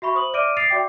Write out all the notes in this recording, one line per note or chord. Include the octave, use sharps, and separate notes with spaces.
F#4 E5 B5 C#6
C5 D#6 F#7
D5 E5 D6 F6 D7 D#7
D#6 A6 C7 D7 F7
F#4 D5 E5 G5 D6